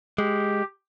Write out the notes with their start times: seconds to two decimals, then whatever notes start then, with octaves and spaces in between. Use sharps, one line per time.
0.18 G#3 G4